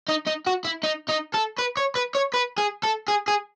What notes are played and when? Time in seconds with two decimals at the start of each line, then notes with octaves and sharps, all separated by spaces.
0.08 D#4
0.27 D#4
0.46 F#4
0.65 E4
0.83 D#4
1.08 D#4
1.34 A4
1.58 B4
1.77 C#5
1.95 B4
2.15 C#5
2.34 B4
2.58 G#4
2.83 A4
3.08 G#4
3.28 G#4